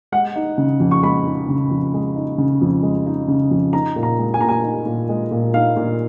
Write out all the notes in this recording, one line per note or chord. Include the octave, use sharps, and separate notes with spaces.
G#3 F#5
D#4
C#3
F2
C#6
G#3 B5
D#4
C#3
F2
G#3
D#4
C#3
F2
G#3
D#4
C#3
F2
D#4 A#5
A#2
A#5
G#3
G#5
A#2 A#5
G#5
D#4
A#2
G#3
A#2
D#4 F5
A#2